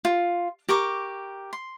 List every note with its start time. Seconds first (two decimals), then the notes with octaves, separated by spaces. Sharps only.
0.05 F4
0.69 G4 A#4 C#6 D6
1.53 C6